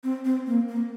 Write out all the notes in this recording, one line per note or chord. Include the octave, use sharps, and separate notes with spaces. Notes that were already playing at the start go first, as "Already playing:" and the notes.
C4
C4
A#3
A#3